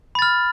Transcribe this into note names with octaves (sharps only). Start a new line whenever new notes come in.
B5 F6 A6